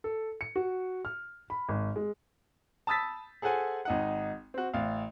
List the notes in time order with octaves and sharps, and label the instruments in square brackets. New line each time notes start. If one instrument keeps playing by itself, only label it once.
[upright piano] A4
C#7
F#4
F6
B5
G#1
G#3
[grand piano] A5 B5 D#6 E6 A6 B6
G#4 A4 C5 F#5 G#5
G#1 D#4 F#5
C4 F#4
A1 F5